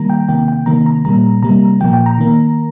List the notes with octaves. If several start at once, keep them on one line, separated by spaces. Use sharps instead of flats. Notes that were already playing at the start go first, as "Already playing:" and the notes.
Already playing: D#3 G3 A#3 A#5
G5
C3 D#3 A#3 G5
G5
C3 D#3 A#3 A#5
A#5
A#2 G3 A#3 A#5
C3 G3 A#3 A#5
A#2 F3 A#3 G5
G5
A#5
D#3 A#3